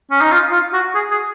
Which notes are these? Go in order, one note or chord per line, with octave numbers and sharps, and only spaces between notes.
C#4
D#4
F4
F4
F#4
G#4
G#4